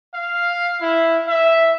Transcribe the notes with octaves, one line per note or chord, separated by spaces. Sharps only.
F5
E4
E5